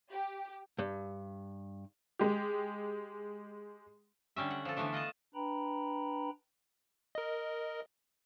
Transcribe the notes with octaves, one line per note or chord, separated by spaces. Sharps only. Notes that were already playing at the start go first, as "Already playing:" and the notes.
G4
G2
G#3 G4
D3 G3 C#4 E5
F#5
F3 A4
D3 E3 A3 B3 D4
F4 D#5 F#5 A5
D4 B4 G5 A#5 B5
A#4 D#5